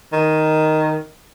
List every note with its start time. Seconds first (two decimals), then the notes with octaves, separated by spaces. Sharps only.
0.13 D#3